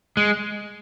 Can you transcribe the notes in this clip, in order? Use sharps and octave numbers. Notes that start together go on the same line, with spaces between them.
G#3